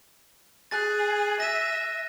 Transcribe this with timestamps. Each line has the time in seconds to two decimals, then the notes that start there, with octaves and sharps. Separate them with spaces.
0.71 G#4 F#6 A6
1.40 E5 A#6 D#7